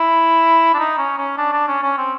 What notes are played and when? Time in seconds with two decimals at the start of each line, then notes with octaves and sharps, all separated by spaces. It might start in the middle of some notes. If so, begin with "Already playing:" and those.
Already playing: E4
0.74 D4
0.79 D#4
0.98 C#4
1.18 C#4
1.38 D4
1.53 D4
1.68 C#4
1.83 C#4
1.97 C4